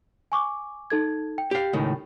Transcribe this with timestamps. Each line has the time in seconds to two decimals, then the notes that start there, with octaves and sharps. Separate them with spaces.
0.32 G#5 C#6 D6
0.90 D#4 A4 G#6
1.38 G5
1.51 G4 F5
1.73 C#2 A2 D#3